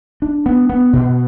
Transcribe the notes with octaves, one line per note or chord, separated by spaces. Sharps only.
D4
B3
B3
B2